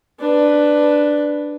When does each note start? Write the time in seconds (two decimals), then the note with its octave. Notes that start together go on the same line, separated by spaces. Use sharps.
0.20 D4 B4